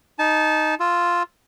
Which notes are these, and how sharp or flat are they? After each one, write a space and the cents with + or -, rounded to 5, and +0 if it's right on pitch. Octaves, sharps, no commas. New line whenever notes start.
D#4 +0 A5 -25
F4 +0 E6 +0